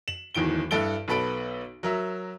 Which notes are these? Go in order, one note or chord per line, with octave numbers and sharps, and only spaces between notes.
E7 F#7
D1 E2 D#3 D7 G7
G2 E4 A4 D7 G7
B1 B3 A4 B5 D7
F#3 A#4 E5